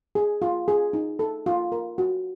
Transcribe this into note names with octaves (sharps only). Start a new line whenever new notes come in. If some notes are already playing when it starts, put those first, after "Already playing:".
G#4
F4
G#4
D#4
A4
F4
A#4
F#4